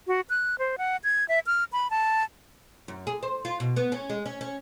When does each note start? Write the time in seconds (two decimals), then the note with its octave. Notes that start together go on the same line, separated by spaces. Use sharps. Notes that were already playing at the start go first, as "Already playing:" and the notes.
0.07 F#4
0.30 F#6
0.59 C5
0.78 F#5
1.04 G#6
1.29 E5
1.47 F6
1.72 B5
1.90 A5
2.88 F#2
3.07 G#4
3.23 C5
3.45 F4
3.60 B2
3.76 B3
3.92 C#4
4.10 G#3
4.26 C#4
4.41 C#4